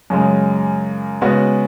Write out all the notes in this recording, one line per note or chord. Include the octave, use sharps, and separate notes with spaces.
F#2 C#3 G#3
C#3 G#3 B3 F#4